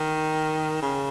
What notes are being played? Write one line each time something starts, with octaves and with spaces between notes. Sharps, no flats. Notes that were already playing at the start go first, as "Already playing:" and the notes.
Already playing: D#3
C#3